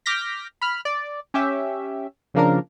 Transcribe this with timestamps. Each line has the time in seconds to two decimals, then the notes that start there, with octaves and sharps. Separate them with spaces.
0.06 D6 F6 G6 A#6 B6
0.61 B5 F6
0.85 D5
1.34 C#4 G4 E5
2.34 C#3 F3 A#3 D4 A#4